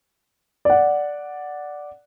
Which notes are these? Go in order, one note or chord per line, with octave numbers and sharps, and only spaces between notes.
D5 F#5